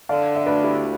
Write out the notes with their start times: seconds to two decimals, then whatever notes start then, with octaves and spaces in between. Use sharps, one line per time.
0.09 D3 D5 F5
0.36 E5
0.45 D2 B4 D5
0.64 E4 G4